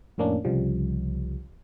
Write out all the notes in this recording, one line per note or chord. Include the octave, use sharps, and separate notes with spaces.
F2 A2 A#3 C#4 D4
C2 C#3 F3 G3